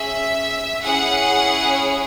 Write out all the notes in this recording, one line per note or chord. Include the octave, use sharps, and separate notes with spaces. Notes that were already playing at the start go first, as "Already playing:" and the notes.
Already playing: C#4 G#4 E5
C#4 E4 G#4 F#5
C#5